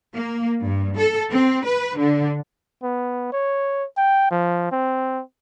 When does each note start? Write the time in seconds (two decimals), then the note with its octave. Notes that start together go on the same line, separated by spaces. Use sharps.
0.14 A#3
0.63 G2
0.96 A4
1.31 C4
1.66 B4
1.97 D3
2.83 B3
3.32 C#5
3.97 G5
4.31 F3
4.71 C4